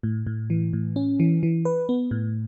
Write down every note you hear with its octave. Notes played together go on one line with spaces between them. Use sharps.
A2
A2
E3
A2
C#4
E3
E3
B4
B3
A2